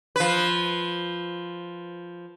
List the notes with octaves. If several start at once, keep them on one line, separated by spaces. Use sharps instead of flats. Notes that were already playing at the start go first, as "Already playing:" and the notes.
F3 B4